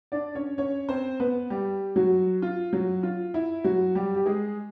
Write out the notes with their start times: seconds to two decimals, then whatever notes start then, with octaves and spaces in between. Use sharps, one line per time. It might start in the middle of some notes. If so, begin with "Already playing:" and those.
0.12 D4 D5
0.35 C#4 C#5
0.58 C#4 C#5
0.89 C4 C5
1.20 B3 B4
1.50 G3 G4
1.96 F#3 F#4
2.42 F4
2.73 F#3 F#4
3.03 F4
3.34 E4
3.64 F#3 F#4
3.95 G3 G4
4.15 G4
4.26 G#3 G#4